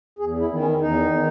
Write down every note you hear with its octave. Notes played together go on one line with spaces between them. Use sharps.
E2 G#4
E4
D#3
C#4
E2 D#4
D#3